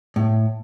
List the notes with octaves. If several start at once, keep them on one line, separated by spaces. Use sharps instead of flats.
A2